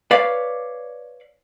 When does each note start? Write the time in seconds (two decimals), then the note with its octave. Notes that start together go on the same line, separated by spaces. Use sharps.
0.11 B4 C#5 D5 F5